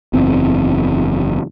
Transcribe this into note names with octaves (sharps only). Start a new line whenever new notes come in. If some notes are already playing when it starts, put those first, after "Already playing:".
F#1 E2 C4